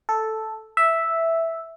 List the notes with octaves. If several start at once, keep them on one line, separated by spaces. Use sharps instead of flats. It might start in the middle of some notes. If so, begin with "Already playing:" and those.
A4
E5